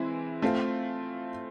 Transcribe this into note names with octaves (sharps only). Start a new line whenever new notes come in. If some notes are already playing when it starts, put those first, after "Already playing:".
Already playing: E3 G#3 C4 E4
A3 C4 F4